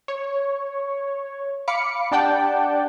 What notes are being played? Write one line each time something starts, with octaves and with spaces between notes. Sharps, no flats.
C#5
F5 B5 D6 C#7
D4 G4 D5 F#5 G5 A5